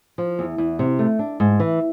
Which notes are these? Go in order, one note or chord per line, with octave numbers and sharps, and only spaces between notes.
F3
E2
E2
C3
A3
D4
G#2
E3